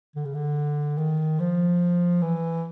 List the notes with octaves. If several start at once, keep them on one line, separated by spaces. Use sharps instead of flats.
D3
C#3
D3
D#3
F3
E3